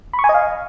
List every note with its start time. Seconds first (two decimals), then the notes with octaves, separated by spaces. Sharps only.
0.13 B5
0.19 C#6
0.24 G#5
0.29 D#5
0.34 F5